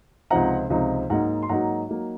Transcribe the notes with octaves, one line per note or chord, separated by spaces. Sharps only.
C#2 C3 F3 C4 D#4 F#5 A#5
C#2 C3 F3 C4 D#4
G#2 F#3 A#3 D#4 F#5 A#5
C6
G#2 F#3 A#3 D#4 F#5 A#5
F#3 A#3 D#4